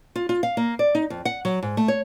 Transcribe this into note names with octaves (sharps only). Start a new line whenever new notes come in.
F4
F4
F5
A#3
D5
D#4
F2
F#5
F#3
G#2
A3
C#5